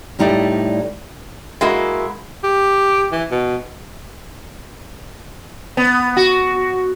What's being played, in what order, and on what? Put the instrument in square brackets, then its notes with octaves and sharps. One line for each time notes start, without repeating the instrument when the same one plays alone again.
[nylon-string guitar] A2 G3 D#4 E4 D5
[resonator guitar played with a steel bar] G#3 A#3 E4 F#4
[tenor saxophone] G4
E3
B2
[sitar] B3
F#4